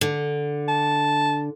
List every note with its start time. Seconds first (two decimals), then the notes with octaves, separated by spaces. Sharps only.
0.01 D3
0.68 A5